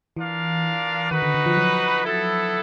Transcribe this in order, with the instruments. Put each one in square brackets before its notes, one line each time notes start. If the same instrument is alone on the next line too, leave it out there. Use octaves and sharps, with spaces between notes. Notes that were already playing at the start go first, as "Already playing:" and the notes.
[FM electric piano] E3 [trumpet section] D4 F4 A#4 D5 F5
[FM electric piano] D#3 [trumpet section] D#4 F#4 B4
[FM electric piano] D3
D3
F3
F#3
[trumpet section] B3 E4 A4